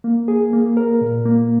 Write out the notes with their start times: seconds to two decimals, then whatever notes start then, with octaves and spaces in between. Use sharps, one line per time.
0.04 A#3
0.28 G#4
0.53 A#3
0.77 A#4
1.01 A#2
1.26 A#3